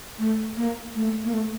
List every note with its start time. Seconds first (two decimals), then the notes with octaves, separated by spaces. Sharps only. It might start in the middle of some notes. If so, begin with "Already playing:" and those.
0.19 A3
0.57 A#3
0.95 A3
1.24 A#3
1.33 A3